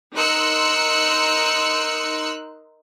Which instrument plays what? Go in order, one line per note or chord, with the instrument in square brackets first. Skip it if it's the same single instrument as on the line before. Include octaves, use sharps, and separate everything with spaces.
[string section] D#4 A#4 C6 E6 F#6 C#7